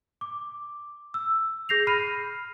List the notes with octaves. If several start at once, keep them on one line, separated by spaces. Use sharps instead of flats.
D6
E6
G#4 G6 A#6 C7 F7
B5 F6 C7 D#7